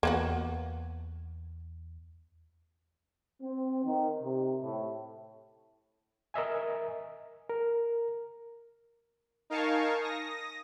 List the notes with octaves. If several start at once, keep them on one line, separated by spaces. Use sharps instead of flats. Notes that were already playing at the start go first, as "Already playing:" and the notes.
E2 A#3 B3 F#4
C4
D#3
C3
A2
A#4 D#5 E5 G#5
A#4
D#4 A#4 F5 G#5 A5 C#6
D#6 A#6